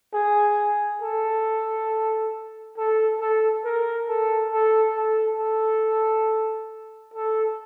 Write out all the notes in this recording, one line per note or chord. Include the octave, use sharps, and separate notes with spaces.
G#4
A4
A4
A4
A#4
A4
A4
A4
A4
A4